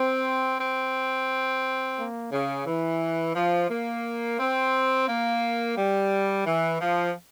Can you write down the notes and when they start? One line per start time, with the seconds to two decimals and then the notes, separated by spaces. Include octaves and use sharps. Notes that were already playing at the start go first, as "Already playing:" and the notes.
Already playing: C4
0.60 C4
1.98 A#3
2.32 C#3
2.66 E3
3.36 F3
3.70 A#3
4.39 C4
5.08 A#3
5.77 G3
6.46 E3
6.81 F3